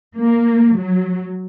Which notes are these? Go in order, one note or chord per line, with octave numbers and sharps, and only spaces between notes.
A#3
F#3